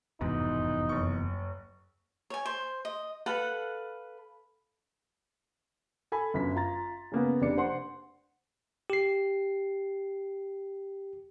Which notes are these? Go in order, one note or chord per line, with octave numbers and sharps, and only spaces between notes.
F1 E2 G#2 B2 D#4
F#1 C#6
C#5 G#5
C5
D#5
A4 B4 F5 F#5
A4 G#5 B5
G1 F#2 B6
F4 A#5 A6
C#3 A#3 B3
F1 C3 D4 C#7
C5 F#5 C6
G4 C7